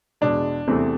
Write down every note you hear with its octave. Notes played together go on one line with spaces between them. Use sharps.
E2 B2 G#3 D4
E2 C3 E3 A3 C4